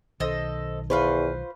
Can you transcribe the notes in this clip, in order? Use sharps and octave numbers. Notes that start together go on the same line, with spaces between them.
B1 D#3 A4 C5 D#5
E2 F4 B4 C5 C#6